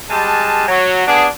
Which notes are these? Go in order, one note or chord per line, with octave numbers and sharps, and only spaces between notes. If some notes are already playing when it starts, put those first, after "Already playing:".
G3 G#3 A5
F#3
B3 D4 G#4